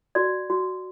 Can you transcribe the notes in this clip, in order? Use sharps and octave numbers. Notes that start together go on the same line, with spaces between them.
F#4 D5
F#4